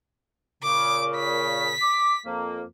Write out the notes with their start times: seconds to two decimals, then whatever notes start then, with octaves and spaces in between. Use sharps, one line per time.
0.63 A#2 C#3 D6
1.16 B6
1.82 D6
2.25 F2 F3 A#3